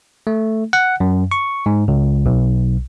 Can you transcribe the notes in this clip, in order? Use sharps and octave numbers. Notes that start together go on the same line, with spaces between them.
A3
F#5
F#2
C#6
G#2
C#2
B1